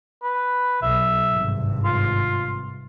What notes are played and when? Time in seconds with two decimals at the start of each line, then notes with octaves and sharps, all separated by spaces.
0.22 B4
0.82 B1 E5
1.32 G#1 G2 C3
1.85 F4